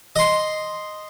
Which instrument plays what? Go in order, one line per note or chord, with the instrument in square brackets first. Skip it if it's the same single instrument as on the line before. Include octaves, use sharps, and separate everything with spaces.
[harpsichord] D#5 C6